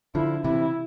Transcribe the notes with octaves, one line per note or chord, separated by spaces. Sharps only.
D3 F3 E4
C3 E3 E4